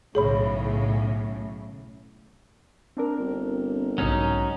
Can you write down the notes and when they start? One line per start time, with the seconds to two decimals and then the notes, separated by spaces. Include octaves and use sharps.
0.15 B1 A2 C#3 G#4 C#5 B5
2.97 C4 D4 A#4
3.19 G1
3.98 B1 G#2 C#3 F#3 C#4 D#4